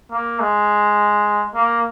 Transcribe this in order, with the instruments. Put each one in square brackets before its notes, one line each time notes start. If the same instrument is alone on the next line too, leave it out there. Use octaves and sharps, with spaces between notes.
[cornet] A#3
G#3
A#3